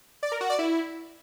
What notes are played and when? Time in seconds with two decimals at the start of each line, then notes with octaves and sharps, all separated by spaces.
0.23 D5
0.32 A#4
0.41 F#4
0.50 D5
0.59 E4